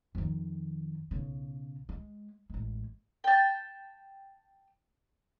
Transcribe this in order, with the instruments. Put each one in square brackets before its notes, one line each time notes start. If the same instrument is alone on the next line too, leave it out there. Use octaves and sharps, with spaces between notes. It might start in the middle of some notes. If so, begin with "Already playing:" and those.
[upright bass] F2 D#3
B1 C#3
G#3
A1 G#3
[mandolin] G5 A5